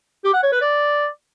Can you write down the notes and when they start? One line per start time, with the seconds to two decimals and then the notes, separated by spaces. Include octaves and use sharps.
0.24 G4
0.33 F#5
0.43 C#5
0.52 B4
0.61 D5